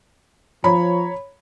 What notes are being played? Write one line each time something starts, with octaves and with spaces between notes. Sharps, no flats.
F3 C#5 A#5 B5